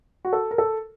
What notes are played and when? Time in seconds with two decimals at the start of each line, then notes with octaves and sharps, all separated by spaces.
0.25 F#4
0.33 A4
0.51 A#4
0.58 A4